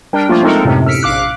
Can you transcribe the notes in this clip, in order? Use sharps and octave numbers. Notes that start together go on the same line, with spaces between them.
G3 D4 A#4 G5
F3 A3 A#3 F4
G#3 C4 D#4 A4 A#4
F#2 A2 C3
E6 F6 B6 C#7 D7
A#1 F5 D6 F#6